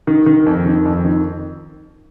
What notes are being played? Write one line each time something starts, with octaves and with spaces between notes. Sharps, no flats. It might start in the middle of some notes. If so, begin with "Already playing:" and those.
D#3
D#3
F2
D#3
F2
D#3